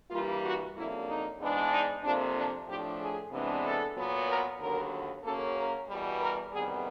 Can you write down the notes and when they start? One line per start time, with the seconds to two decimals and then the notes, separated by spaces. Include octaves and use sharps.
0.11 G2 E3 G3 A#3 F4
0.43 F#4
0.75 F2 C#3 F#3 A#3 D4 E4
1.07 D#4
1.39 G#2 E3 G#3 B3 D4
1.71 D#4
2.02 F2 C3 F3 A#3 D4
2.35 D4
2.67 A2 F3 A3 D4 G4
2.99 G#4
3.31 C3 E3 G#3 B3 D4
3.63 A4
3.96 A#2 F#3 B3
4.28 A#4
4.59 D#2 D3 F#3 B3 A#4
5.23 F#2 C#3 F#3 A#3 C#4 A4
5.56 A#4
5.87 E2 B2 G3
6.20 A#4
6.52 E2 C3 D#3 G3 B3 G#4